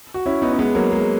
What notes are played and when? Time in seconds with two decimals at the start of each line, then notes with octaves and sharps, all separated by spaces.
0.14 F#4
0.26 C#4 E4
0.42 B3 D#4
0.53 C#4
0.59 G#3 B3
0.75 F#3 A#3
0.92 G#3